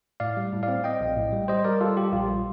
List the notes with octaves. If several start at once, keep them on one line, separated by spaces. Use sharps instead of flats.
A2 D5 F5
G3
A2
D5 F5
C4
C4 D#5 G5
A#1
A2
G3
G3 C5 D#5
G3 A#4 D5
G3 F4 A4
G3 G4
A#1 F4
G3